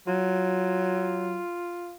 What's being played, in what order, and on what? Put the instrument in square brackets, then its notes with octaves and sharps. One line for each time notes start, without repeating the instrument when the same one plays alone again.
[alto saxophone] F#3 [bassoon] F4